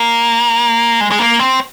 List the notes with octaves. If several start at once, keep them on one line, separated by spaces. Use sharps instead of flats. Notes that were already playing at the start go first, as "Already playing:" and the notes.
Already playing: A#3
G#3
G#3
A#3
C4